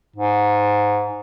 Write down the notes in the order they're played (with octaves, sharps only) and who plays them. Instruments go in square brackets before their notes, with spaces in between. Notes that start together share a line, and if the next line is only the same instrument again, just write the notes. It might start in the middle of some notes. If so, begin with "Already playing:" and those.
[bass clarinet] G#2